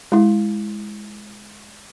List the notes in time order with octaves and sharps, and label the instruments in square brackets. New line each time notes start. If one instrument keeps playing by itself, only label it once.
[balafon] G#3 E4